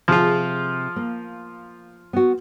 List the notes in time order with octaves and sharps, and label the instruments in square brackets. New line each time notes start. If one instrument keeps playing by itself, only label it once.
[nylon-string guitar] C3 G#4 [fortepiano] F3 F4
[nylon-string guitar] A#3
B3 F#4